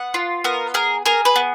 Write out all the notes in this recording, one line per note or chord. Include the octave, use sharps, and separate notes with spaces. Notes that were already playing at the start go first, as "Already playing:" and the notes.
Already playing: B3 F#5
F4
B3 A#4
G#4 A#4
G#4 A#4
B4
B3